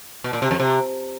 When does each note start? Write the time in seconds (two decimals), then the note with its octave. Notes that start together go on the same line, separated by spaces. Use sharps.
0.24 B2
0.33 A#2
0.42 C3
0.51 F2
0.60 C3